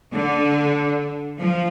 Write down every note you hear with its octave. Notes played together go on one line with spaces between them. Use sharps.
D3
F3